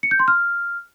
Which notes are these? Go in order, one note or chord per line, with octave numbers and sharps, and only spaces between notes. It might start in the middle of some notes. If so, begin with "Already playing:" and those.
C#7
G6
C6
F6